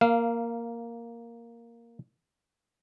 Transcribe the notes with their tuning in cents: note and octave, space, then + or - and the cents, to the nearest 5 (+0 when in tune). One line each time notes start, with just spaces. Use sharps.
A#3 +0 F5 -15